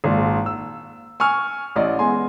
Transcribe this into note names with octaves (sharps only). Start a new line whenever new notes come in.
G#1 A#2
E6
G#5 C#6 E6 F6
A1 D5 D#5
G#3 B3 G#5 C6